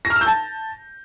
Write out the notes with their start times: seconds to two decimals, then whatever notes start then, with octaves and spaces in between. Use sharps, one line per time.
0.05 A#6
0.10 F6
0.16 E6
0.21 G6
0.26 A5